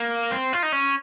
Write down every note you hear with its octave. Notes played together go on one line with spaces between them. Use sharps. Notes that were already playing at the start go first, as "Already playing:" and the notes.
Already playing: A#3
C4
F4
D#4
C#4